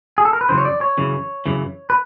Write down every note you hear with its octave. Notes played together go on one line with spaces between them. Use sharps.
G#4
A4
A#4
B4
F#2 C#3 E3 C5
C#5
D5
C#5
F#2 C#3 E3
F#2 C#3 E3
B4